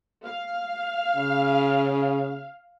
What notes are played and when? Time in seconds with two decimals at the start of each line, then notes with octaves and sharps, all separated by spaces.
0.24 F5
1.16 C#3